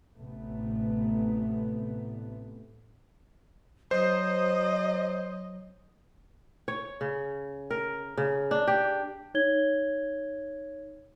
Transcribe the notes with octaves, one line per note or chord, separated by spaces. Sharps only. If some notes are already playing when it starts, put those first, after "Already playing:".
A1 C3 A3 B3
F#3 C5 D#5
C#5
C#3
A#4
C#3
D4
G4
D#4 C#5 G#6 G7